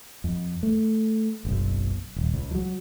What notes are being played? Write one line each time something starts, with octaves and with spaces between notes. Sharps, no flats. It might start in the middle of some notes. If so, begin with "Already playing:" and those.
F2
A3
F#1 B1
D#1
C#2
F3 F#3